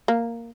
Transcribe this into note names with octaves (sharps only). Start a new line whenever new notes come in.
A#3